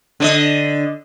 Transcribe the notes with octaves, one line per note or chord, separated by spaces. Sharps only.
D3 D5 D#5